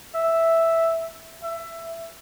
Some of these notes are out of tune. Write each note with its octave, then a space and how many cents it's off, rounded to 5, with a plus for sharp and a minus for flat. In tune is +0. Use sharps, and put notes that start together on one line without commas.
E5 +0
E5 +15